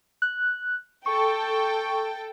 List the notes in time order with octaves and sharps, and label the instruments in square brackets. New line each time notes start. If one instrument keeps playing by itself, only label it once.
[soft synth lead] F#6
[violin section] A4 G5 [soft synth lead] C#6